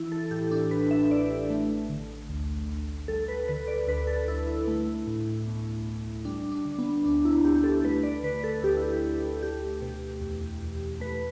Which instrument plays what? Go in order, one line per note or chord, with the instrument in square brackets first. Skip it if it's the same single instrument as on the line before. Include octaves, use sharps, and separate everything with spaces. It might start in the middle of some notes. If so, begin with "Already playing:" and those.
Already playing: [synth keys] E3 E4
A4
A2 G4
D4
A1 B4
E5
A1 D5
A3
D3
D2
D2
G3 A4
B4
D3 B4
D5
D2 B4
A4
D2 E4
E4
A3
A2
B1
B1
G3 D4
D4
D3
B3
D2 D4
E4
D2 G4
A4
A3 B4
D5
D3 B4
A4
D2 G4
E4
G4
D2
A3 G4
B2
E2
E2
A3 B4